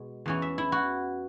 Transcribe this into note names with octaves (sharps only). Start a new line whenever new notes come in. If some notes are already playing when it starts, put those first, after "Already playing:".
Already playing: B2 G#3
E2 E3 C#4
E5
E4
F#4